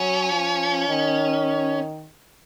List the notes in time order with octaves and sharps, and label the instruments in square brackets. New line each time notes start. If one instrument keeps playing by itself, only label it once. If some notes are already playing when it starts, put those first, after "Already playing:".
Already playing: [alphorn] F#3 [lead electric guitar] C#4
[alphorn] F3
D#3